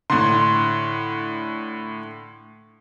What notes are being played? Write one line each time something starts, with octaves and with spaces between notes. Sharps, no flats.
A2 D3 C6